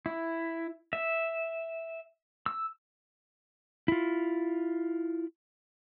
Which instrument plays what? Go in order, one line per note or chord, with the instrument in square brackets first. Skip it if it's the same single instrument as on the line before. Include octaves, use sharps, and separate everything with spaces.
[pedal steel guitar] E4
E5
E6
[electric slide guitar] E4 F4